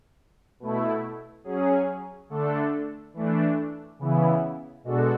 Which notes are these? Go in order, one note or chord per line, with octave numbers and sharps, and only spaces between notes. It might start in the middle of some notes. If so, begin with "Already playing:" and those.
B2 A3 E4
F#3 C#4 G#4
D3 A3 D4 A4
E3 A3 D4
C#3 E3 B3 E4
B2 G#3 D4 F#4 A4